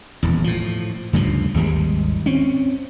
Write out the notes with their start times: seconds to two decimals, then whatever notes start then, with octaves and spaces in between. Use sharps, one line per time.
0.23 D#1 E2
0.44 A2 F3
1.13 D2 G2 C#3 F3
1.54 G#1 D#2 G3 G#3
2.26 C4 C#4